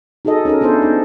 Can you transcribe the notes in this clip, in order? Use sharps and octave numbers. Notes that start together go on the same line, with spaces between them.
D#4 F#4 G#4 A4 D#5
C#4 D#4 A4 A#4
B3 D4 E4 A4 C5
B3 D#4